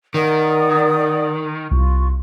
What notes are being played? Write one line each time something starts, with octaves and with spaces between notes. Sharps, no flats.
D#3 A#4 D5 F#5 D#6
C2 F4 C#6